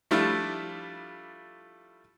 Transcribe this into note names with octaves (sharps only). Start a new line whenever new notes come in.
F3 G3 A3 D4 E4 F4